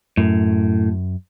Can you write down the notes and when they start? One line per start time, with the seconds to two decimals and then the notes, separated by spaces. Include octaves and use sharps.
0.17 F#2 A2